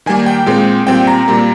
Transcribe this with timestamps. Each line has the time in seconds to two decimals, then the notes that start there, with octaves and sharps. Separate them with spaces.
0.06 D#3 G3 A#3 G#5
0.26 G5
0.46 A#2 G#3 C4
0.87 A#2 G3 C4 G5
1.07 A#5
1.28 A#2 G3 A#3